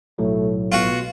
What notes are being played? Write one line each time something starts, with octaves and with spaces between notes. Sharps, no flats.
B1 A2 F#3 A3
B2 F4 F#4